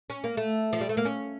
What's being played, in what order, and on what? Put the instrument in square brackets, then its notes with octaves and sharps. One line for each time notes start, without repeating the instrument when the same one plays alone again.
[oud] C#4
A#3
A3
F3
G3
A3
A#3
C#4